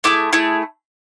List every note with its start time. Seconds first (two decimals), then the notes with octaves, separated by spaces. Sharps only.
0.04 A3 E4 G#4 D6
0.33 A3 E4 G#4